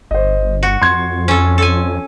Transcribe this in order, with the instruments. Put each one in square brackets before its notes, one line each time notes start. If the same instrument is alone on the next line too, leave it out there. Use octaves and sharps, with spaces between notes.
[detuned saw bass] G1 [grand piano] C5 D#5
[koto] F#4 [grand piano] C#7
[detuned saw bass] F2 [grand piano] C6 G#6
[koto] C#4 A4
A4 G#5